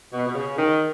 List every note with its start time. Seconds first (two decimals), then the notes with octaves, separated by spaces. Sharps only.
0.13 B2
0.28 B2
0.35 C#3
0.58 D#3